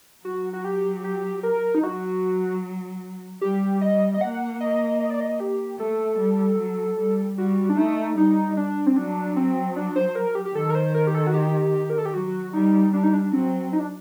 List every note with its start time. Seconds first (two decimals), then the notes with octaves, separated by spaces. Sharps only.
0.24 F#3 F#4
0.53 F#4
0.64 G4
1.04 G4
1.43 A#4
1.75 D#4
1.83 F#3 F#4
3.41 G3 G4
3.81 D#5
4.14 D#5
4.20 A#3 F#5
4.61 D#5
5.00 D#5
5.10 D5
5.20 D#5
5.40 G4
5.79 A3 A4
6.19 G3
6.59 F#3
6.99 G3
7.37 G3 F#4
7.69 D4
7.77 A3 D#4
8.17 G3 D#4
8.57 D4
8.86 C4
8.96 F#3 D4
9.36 C4
9.76 D4
9.96 C5
10.15 A#4
10.35 G4
10.45 G4
10.55 D#3 A4
10.70 A#4
10.75 C5
10.94 A#4
11.07 G4
11.15 A4
11.27 F#4
11.34 G4
11.90 A#4
11.98 A4
12.05 G4
12.14 F#3 F#4
12.53 G3 D#4
12.93 G3 D4
13.03 D#4
13.13 D4
13.33 F#3 C4
13.73 D#4
13.79 D4